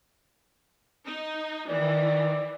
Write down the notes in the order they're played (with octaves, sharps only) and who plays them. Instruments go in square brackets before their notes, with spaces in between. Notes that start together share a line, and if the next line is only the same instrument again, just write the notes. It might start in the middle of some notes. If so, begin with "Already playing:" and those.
[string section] D#4
[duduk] D#3 [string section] E3 [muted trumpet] D5